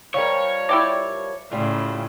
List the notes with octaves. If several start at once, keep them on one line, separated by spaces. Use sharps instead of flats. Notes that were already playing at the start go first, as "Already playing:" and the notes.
F3 G3 A#4 C#5
E4 G4 D5
A2 C#3 G3 F4